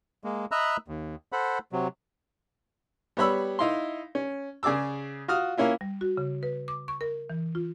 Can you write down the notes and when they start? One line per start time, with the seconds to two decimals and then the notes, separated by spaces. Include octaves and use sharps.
0.24 G#3 A#3
0.51 D#5 E5 A#5 B5 E6 F#6
0.88 D#2
1.32 A4 C5 F#5 B5
1.72 C3 F#3
3.17 G3 B3 C#5 B5 E6
3.59 D#4 E4 F5 C6
4.15 C#4
4.63 C#3 G#4 D5 D6 E6
5.28 F4 F#4 D#6 F6
5.57 A#3 C#4 E4 F4
5.81 G3
6.01 F#4
6.17 C#3
6.43 B4
6.68 D6
6.88 C#6
7.01 A#4
7.30 E3
7.55 F4